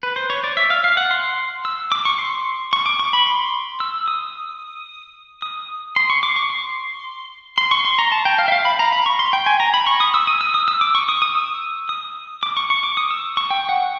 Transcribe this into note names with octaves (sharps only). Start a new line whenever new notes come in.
B4
C5
C#5
D5
E5
F5
F5
F#5
C6
E6
D6
C#6
C6
C#6
D6
C#6
B5
C6
E6
D#6
D#6
C6
C#6
D6
C#6
C6
C6
C#6
C6
A#5
A5
G5
F5
E5
F5
B5
A#5
B5
C#6
C6
G5
G#5
A#5
B5
C#6
D#6
E6
D#6
E6
D#6
E6
D6
C#6
D#6
D#6
E6
D#6
D6
C#6
C#6
D6
D#6
E6
C#6
G5
F#5